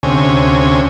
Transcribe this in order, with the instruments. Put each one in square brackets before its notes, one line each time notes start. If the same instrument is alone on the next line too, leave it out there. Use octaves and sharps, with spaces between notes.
[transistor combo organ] D2 C3 C#4 G#5